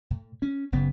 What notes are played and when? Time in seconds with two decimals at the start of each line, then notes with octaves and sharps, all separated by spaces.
0.11 A2
0.42 C#4
0.72 F#1 C#3 B3